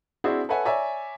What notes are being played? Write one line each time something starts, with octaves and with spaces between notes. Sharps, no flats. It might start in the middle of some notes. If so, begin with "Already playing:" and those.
C4 D4 E4 F#4 G#4
A4 B4 C#5 E5 F#5 G#5
C#5 D5 E5 G#5 A#5